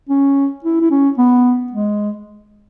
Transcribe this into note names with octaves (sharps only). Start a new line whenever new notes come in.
C#4
E4
E4
C#4
B3
G#3